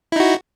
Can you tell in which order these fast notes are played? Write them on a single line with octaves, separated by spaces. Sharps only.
E4 D#4 F#4